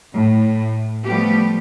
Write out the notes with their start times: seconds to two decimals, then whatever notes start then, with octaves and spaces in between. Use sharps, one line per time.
0.13 A2
1.06 F3 G3 A3 B3 G4